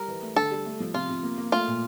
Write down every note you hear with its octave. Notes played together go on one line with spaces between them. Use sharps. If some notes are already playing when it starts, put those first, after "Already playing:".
Already playing: G3 A#4
E3
A3
D3 A4
G3
A3
F3
C3 F4
C3
A#3
A#3
A3 F4
A#2